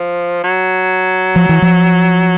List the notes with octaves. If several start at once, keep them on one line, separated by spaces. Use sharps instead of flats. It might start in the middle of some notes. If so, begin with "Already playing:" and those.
Already playing: F3
F#3
F3
E3
F3